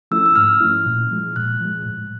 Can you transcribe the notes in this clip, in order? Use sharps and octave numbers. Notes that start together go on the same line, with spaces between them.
F3 A3 C#4 E4 E6
E6
G#2 F6
F3 A3 C#4 E4
A#2
F3 G#3
A#2 F#6
F3 G#3
A2